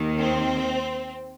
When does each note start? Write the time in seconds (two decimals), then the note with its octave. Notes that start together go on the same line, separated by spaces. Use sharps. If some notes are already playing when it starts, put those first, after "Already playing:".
Already playing: D#2 D#3
0.19 C4